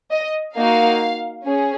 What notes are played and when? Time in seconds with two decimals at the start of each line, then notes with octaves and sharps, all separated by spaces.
0.11 D#5
0.55 A#3 D#4 F#4 F5
1.44 C#4 G#4